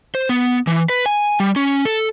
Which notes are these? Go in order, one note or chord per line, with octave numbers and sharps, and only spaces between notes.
C5
B3
E3
B4
G#5
G3
C#4
A4